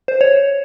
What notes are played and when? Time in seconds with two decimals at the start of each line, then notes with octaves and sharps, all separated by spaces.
0.08 C5
0.21 C#5